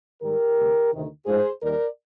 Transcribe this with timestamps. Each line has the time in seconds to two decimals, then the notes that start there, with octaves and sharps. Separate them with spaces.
0.22 G#2 D#3 G3 G4 A#4
0.57 D2 C3 G3
0.92 D2 C3 D#3
1.26 G#2 F3 G#4 C5
1.61 D#2 D#3 G3 A#4 D5